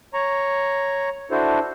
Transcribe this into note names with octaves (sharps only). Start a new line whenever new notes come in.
C#5 A#5 C#6
D4 E4 F#4 A4 C5